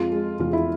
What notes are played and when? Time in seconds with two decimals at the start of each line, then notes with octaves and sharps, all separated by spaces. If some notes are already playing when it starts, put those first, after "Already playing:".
Already playing: F2 G#3 F4
0.12 G#3
0.39 E2 F4
0.53 E4